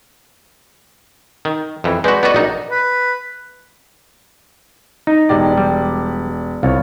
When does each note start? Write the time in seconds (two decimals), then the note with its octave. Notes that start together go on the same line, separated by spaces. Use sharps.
1.45 D#3
1.84 F2 E3
2.04 G#3 F#4 B4 D5 G6
2.23 B3 F#4 A4 D5 D#5
2.34 A#1 D#4 F#4 A#4
2.71 B4
5.07 D#4
5.29 E1 G4 D5
5.57 G3
6.63 C2 F4 C#5